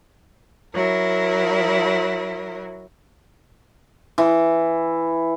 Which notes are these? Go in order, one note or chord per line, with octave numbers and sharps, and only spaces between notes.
F#3 E4 A#4
E3